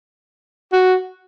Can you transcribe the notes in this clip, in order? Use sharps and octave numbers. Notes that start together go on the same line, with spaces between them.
F#4